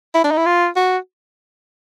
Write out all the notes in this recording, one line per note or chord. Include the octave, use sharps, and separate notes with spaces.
E4
D4
D#4
E4
F4
F#4